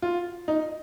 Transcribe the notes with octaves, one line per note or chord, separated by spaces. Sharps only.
F4
D#4